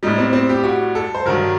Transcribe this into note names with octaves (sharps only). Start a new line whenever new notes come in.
A2 G3 D#4
C4
C4
G4
F#4
A4
C5
G2 D#3 F#3 A#4